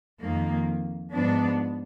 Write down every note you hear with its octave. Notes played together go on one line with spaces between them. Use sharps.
F2 D#3 A#3
G#2 F3 B3 D4